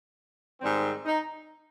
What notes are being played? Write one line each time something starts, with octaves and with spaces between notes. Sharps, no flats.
G#2 D#3 G3 C4
D#4